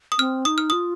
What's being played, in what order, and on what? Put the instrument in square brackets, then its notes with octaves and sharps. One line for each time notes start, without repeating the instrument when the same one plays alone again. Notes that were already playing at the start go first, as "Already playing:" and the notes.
[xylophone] D#6
[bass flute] C4 [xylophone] F6
[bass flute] D#4 [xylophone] D#6
[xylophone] F6
[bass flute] F4 [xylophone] D#6